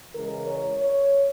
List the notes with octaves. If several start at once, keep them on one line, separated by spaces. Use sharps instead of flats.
C#3 E3 G#3 A#4
C#5
C#5